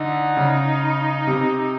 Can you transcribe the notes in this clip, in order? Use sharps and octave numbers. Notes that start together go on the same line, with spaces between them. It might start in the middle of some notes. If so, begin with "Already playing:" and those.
Already playing: D3 D#4
C#3
C3